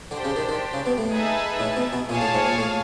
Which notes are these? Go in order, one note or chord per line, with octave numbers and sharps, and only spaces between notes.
D3 D4 G4 C5
C#3
D#3
D#3
C#3
B2
A2
D#4 G#4 B4 E5 A5
A2
B2
B2
A#2 G#4 C#5 F5 A5
A2
G#2
A#2
A2